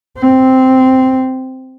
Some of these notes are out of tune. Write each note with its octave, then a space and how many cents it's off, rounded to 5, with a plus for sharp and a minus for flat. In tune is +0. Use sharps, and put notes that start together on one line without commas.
C4 -5